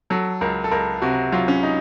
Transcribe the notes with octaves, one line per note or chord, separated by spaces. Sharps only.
F#3 A4
C#2 A#4
A4
C#2 A#4
C3 F#4
F#3 F4
C#4
D#4